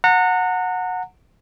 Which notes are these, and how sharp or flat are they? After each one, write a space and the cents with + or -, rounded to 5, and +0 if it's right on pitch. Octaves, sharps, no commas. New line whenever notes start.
F#5 -15 A#5 -35